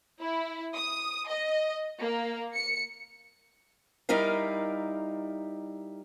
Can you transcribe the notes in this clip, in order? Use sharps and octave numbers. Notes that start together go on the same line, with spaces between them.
E4
D#6
D#5
A#3
C#7
G3 D#4 E4 A#4 F5